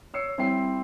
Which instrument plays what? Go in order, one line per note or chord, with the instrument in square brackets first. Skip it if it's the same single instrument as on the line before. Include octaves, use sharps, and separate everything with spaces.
[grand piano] C#5 E6 C7 C#7
G3 C4 E4 G5 C7